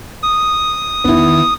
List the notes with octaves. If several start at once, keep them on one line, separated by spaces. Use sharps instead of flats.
D#6
E2 D#3 B3 E4